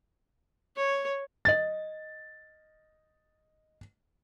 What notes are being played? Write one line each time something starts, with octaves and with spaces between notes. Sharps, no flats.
C#5
D#5 A6